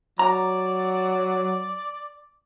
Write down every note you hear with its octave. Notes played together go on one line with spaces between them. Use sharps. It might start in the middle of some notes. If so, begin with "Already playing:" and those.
F#3 D5 A#5